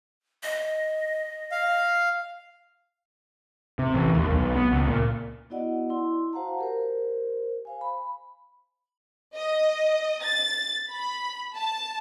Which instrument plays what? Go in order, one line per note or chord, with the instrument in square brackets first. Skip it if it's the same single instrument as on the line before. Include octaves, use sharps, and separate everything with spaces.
[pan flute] D#5
[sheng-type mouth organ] F5
[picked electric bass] C3
A1
D#2
B1
B3
C#2
A#2
[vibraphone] B3 E4 F#4 D5 D#5 F#5
E4 C6
F#4 C5 F5 F#5 A5 A#5
G4 A#4 C5
C5 F5 G#5
B5
[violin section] D#5
A6
B5
A5